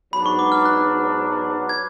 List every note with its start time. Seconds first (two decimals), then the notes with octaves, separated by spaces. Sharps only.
0.12 G#2 F#3 B3 D4 B5
0.26 C#6
0.39 D6
0.52 F6
0.65 F#6
1.69 G#6